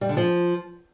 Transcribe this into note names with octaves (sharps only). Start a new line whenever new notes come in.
G3
D3
F3